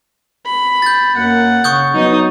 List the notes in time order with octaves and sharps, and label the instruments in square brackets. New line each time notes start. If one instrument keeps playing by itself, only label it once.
[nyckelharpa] B5
[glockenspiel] G6 A6
[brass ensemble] F#2 A#3 [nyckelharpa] F#5
[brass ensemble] C#3 [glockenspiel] C#6 D#6 G6
[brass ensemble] F#3 B3 [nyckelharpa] D#4 D#5